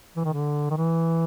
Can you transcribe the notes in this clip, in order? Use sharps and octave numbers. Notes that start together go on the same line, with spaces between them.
E3
D#3
D3
D#3
E3